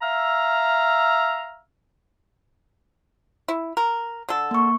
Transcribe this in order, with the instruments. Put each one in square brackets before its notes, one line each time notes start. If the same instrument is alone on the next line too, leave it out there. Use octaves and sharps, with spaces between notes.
[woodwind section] E5 F5 A#5 E6 F6
[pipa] E4
A#4
D3 A4
[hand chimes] A#3 C#6